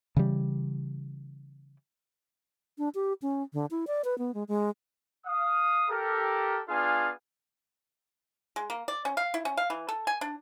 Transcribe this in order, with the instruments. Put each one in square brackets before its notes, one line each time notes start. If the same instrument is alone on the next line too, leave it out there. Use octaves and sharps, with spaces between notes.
[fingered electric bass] C#3 E3 G3
[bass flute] D4
G4
C#4
D3
E4
D5
B4
B3
G#3
G#3
[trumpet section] F5 D#6
G4 A4 A#4
B3 D4 F4 G#4 F5 G#5
[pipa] G#3
A#3
D5
C#4
F5
E4
C#4
F5
E3
A4
G#5
D4